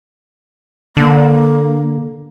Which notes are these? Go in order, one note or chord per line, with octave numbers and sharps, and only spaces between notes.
D3 A#3